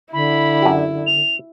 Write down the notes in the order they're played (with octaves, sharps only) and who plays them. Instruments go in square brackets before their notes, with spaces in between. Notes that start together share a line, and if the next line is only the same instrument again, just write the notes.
[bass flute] D3 [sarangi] E4 [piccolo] B5
[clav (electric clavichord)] F#2 G4
[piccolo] F7